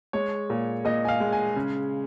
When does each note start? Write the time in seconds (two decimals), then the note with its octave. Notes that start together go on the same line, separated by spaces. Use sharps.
0.13 G#3 C#5
0.50 A#2
0.85 A#2 D#5
1.05 G#5
1.08 F5
1.20 G#3
1.32 G#5
1.56 C#3